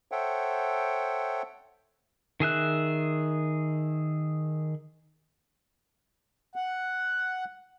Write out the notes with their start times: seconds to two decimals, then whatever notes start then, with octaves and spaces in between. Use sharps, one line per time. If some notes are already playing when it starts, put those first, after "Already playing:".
0.12 A4 C5 C#5 E5 F#5 G5
2.40 D#3 G#4 E5 F#6
6.56 F#5